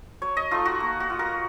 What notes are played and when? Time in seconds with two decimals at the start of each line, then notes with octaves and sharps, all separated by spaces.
0.22 F#3 C#5
0.37 D#5
0.51 A3 D#4 F4
0.65 F#4
0.80 A#3
1.00 F#4
1.10 F4
1.19 A#4